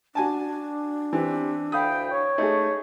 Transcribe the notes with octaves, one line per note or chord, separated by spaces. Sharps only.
D4 F#4 G#5 A5
E3 C4 G4
D2 F5 G5 B5 D#6
C#5
A3 D#4 G#4